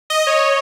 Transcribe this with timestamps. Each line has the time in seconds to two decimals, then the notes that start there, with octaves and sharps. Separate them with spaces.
0.10 D#5
0.27 C#5